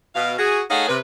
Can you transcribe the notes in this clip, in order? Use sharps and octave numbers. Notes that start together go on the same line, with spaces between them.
B2 F5
F#4 G#4
A3 D#4 G#4 C#5 F5 F#5
C3 B4